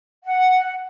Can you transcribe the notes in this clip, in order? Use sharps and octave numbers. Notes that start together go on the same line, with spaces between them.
F#5